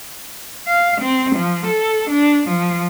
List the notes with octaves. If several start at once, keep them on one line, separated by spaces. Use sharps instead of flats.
F5
C4
F3
A4
D4
F3